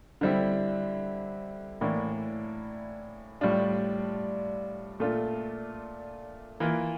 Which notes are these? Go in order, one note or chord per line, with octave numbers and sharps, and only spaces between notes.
D3 G3 C4 E4
A2 E3 A#3 D4
A2 G3 D4 F4
A#2 A3 D4 F4
E3 A#3 F4